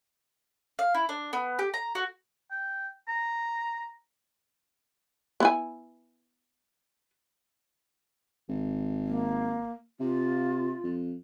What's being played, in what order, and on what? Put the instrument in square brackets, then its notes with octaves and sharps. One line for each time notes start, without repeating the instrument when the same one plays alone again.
[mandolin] F5
E4
D4
B3
G4
A#5
F#4
[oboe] G5
A#5
[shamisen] B3 E4 G#5
[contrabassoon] G#1
[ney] A#3
[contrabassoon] C3 [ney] F4
[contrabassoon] F2